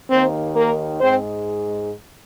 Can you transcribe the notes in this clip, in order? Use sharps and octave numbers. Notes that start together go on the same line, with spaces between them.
D#2 D#3 A#3 C4 C5
A#3 A#4
G#2 G#3 C4 C5